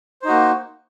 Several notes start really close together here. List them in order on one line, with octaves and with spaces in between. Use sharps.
C5 D#4 F#4 A#3